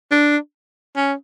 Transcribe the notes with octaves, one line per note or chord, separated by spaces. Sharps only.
D4
C#4